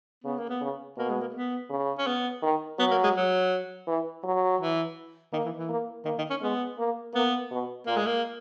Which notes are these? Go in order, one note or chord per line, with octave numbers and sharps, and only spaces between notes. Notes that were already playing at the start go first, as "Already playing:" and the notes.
C#3 B3
A#3
B3
C#3
B2 A#3
G#3
A#3
B3
C#3
C#4
B3
D#3
F#3 B3
A#3
G#3
F#3
E3
F#3
E3
D#3 A#3
E3
E3
A#3
D#3 A#3
D#3
C#4
G#3 B3
A#3
A#3 B3
B2
A#2 A#3
G#3
A#3